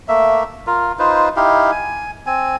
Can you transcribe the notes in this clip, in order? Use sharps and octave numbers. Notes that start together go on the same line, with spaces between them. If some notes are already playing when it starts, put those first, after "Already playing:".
A3 A#3 E5
F4 A#4
D#4 F4 B4 C5
D#4 E4 G4 F5
G#5
C4 G#5